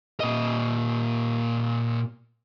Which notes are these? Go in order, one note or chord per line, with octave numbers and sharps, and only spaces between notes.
A#2 D#5